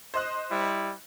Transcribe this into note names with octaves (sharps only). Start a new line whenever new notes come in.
C5 D#5 F#6
G3 E4